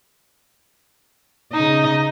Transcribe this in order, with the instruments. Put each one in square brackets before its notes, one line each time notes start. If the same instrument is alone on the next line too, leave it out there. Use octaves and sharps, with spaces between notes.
[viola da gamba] C#3 D#5 [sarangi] D#4